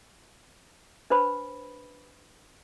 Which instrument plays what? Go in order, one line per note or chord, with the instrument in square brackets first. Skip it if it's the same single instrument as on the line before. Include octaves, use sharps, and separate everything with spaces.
[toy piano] D4 B4 C5 B5